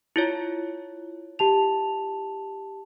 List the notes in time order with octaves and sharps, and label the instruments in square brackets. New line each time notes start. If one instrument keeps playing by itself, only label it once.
[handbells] E4 F4 C#5
[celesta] G4 A5 F7